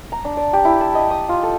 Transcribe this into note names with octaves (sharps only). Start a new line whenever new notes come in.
A#5
D4
D5
G4
E4
A5
D#5
D#6
F4
A4